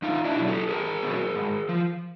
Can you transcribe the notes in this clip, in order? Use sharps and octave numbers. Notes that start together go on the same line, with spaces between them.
E2 D#4 F4
D4 E4
B2 F#3
G4 A4
E2 G#4 A#4
B2 F#3
G#2
F3